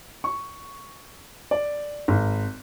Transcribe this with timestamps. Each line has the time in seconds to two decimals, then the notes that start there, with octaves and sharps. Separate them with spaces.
0.24 C#6
1.51 D5
2.08 G#1